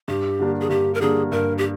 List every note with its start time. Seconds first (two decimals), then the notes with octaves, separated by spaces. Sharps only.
0.08 G2 G4
0.39 D3 G3 A#3 D4
0.61 G#4
0.70 G2 G4
0.94 A#4
1.00 D3 G3 A#3 D4 G#4
1.32 G2 A#4
1.58 G4